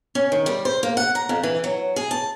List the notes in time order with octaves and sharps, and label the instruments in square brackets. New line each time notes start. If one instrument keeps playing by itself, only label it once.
[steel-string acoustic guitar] C#4
D#3
G3
C5
A#3
F#5
A#5
F2
E3
F#3
G#4
A5